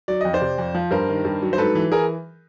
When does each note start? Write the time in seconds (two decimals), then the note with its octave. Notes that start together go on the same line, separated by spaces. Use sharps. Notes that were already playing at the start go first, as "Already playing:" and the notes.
0.08 F#3 D5
0.21 F2 D#5
0.33 C5 D5
0.41 C3
0.58 F2
0.75 F3
0.91 G2 A#4 C5
1.08 D#3
1.25 G2
1.42 F#3
1.53 C5
1.58 G#2 A4 B4
1.75 E3
1.92 E3 G#4 A#4